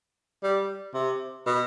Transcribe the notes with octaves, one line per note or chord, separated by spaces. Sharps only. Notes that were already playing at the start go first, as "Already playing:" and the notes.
G3
C3
B2